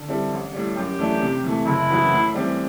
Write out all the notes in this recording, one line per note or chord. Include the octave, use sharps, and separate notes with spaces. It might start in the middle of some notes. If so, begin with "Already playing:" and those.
Already playing: D3
G3 C4 E4 A4
A1
A2 G3
F#2 G4
E3 A3 D4
C3
E3 A3
F#1 E4
F#2 E3 B3 F#4
A2
E3 G3 C4 G4